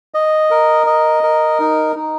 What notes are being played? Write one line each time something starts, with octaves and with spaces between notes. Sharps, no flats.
D#5
A#4
D#5
A#4
D#4
D#4